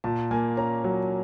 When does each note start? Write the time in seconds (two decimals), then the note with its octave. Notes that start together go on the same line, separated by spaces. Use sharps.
0.04 A#2 A5
0.31 A#3 G#5
0.57 C#4 A#5
0.84 F#3